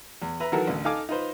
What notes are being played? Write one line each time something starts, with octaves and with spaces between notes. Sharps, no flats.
E2
B4 E5 A#5
D#3 E3 F#3 F#4 A4 A#4
A1 D2
D#4 A4 F5 G#5 D6
D#4 F4 B4 C5